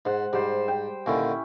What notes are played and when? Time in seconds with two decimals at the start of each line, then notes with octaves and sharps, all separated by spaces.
0.05 G#2 C5 F#5
0.33 G#2 G3 C5
0.68 G5
1.06 A#2 D3 D#3 C#4 E4